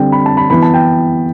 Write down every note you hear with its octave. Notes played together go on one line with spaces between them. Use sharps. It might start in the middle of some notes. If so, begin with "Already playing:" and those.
Already playing: D3 G3 C4 G5
B5
A5
B5
E3 B3 B5
A5
G5